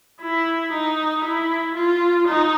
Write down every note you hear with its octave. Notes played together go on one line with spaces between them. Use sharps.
E4
D#4
E4
F4
D#4